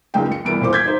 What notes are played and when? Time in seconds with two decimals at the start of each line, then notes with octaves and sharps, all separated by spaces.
0.14 C#2 F#2 C#3 D#4 G5
0.32 C#7
0.45 C2 E3 B3 D7
0.60 D#1 A#2 C5 D6
0.73 G6 G#6 B6
0.85 D#4 C5